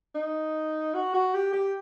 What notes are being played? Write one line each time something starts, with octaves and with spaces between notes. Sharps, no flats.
D#4
F#4
F#4
G4
G4